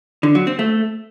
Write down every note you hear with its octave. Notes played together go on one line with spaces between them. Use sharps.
D3
F#3
C4
A3